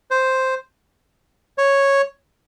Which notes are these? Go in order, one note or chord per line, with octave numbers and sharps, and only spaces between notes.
C5
C#5